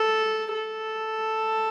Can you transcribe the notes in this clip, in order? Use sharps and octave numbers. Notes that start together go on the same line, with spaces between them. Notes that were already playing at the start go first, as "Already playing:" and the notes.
Already playing: A4
A4